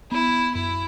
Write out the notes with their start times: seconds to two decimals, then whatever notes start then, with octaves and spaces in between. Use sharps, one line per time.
0.11 B3 E4
0.55 F#2 E4